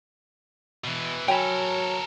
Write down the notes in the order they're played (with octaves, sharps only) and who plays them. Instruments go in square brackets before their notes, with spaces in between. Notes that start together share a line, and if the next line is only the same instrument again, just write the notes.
[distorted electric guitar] B2 E3
[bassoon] F#3 [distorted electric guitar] A4 A#4 [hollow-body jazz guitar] G5 G#5 B5